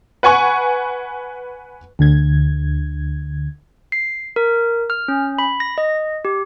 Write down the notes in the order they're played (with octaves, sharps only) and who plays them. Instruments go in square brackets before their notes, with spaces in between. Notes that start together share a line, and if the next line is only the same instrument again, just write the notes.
[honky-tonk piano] B4 F#5 G#5 C#6
[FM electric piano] D2 D3 G#6
[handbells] C7
A#4
F6
C#4
B5
A#6
D#5
G4